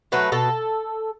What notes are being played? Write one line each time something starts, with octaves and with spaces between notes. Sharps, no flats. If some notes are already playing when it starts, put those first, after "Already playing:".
F#3 A3 B4
B2 A4